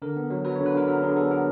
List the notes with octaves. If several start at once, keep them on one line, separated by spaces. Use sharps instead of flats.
D3 A#4
B3
F#3
F#3 B4
C#5
D3
B4
D3 A#4
F#3 A#4
D3 G#4
B3 A4
B3 A#4